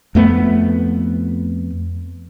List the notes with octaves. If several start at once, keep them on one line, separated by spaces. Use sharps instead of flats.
F2 A3 B3